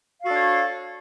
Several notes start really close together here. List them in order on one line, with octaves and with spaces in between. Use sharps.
F5 F#4 A4 D4 C#5